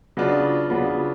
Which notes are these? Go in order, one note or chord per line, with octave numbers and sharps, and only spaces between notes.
C#3 F#3 B3 D4 F4
C#3 F#3 B3 D4 F4